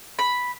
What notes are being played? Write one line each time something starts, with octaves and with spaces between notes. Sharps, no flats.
B5